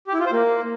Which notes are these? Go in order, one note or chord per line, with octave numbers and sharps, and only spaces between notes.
G4
E4
F4
C5
A#3